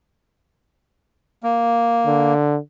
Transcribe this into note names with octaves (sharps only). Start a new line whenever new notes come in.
A#3
D3